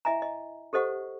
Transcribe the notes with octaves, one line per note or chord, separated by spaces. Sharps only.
E4 D#5 E5 G#5 A#5
D#5
G4 A4 C5 D#5 F#5 C#6